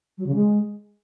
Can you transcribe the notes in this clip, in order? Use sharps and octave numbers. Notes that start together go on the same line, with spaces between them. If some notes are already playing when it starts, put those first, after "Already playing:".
F#3
C#3
G#3